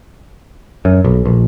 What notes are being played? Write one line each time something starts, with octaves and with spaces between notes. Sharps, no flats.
F#2
B1
A#1